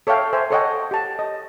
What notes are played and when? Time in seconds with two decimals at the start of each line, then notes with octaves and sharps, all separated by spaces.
0.07 A4 C#5 E5 F5 G5
0.33 C5 E5 G#5
0.50 A4 C5 C#5 D#5 F#5 G5
0.91 G4 A5
1.19 D#5